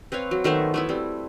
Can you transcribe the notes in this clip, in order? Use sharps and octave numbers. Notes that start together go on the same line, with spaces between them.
C4 B4 C#5 F5
F#3
D#3 A3 B3 C5
A3 B3 E4
G3 C4